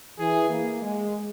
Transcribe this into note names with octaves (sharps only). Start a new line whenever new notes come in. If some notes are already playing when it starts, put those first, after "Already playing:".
E3 G#4
A#3
G#3